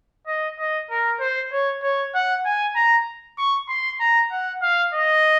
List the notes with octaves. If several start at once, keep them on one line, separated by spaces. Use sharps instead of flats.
D#5
D#5
A#4
C5
C#5
C#5
F#5
G#5
A#5
C#6
C6
A#5
F#5
F5
D#5